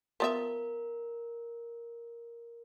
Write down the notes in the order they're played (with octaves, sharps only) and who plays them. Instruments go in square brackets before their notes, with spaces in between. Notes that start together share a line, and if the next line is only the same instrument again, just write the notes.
[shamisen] F3 B3 E5 [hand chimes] A#4